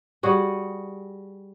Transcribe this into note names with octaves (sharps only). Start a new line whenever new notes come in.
G3 F#4 G#4